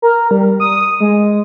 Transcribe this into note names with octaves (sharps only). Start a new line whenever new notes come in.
A#4
G3
D#6
G#3